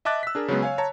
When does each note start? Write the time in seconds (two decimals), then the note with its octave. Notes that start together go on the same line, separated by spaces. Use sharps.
0.05 D#5 E5 A5 D6 F#6 A6
0.23 E6 B6
0.35 D4 G#4 A#4
0.48 C#3 F#3 G#3 B3
0.62 C#5 F5 G#5
0.78 C#5 A5 A#5